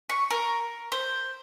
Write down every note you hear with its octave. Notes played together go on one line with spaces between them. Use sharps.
C#6
A#4
C5